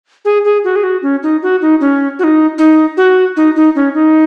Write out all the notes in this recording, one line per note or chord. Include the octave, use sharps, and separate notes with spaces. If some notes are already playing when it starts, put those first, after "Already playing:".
G#4
G#4
F#4
G#4
F#4
C#4
D#4
F#4
D#4
C#4
F#4
D#4
D#4
F#4
D#4
D#4
C#4
D#4